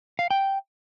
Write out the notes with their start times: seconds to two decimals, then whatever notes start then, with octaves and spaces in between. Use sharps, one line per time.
0.19 F5
0.31 G5